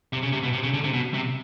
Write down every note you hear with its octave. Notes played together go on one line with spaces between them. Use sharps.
C3
C#3
C3
B2
C3
C#3
D3
C3
B2
C3